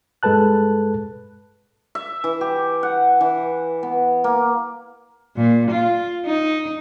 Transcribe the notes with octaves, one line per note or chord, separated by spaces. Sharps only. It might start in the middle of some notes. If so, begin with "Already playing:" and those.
G2 G#3 A4 B4 A5 F#6
E5
E3
G4
F#5
E3
B3
A#3
A#2
F4
D#4